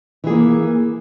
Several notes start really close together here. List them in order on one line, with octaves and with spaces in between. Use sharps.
E3 G#4 A#3